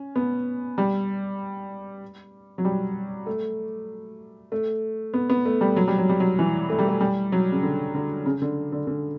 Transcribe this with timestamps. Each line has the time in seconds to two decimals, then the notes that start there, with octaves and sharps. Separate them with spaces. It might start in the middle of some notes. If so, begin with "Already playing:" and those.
Already playing: C#4
0.16 B3
0.78 G3
2.58 F#3
2.65 G3
3.26 A3
4.52 A3
5.14 B3
5.30 B3
5.45 A3
5.61 G3
5.76 F#3
5.88 G3
5.98 F#3
6.09 G3
6.20 F#3
6.39 E3
6.70 A3
6.79 G3
6.88 A3
7.01 G3
7.32 F#3
7.52 C#3
7.63 D3
7.94 D3
8.26 C#3
8.42 D3
8.72 D3
8.87 D3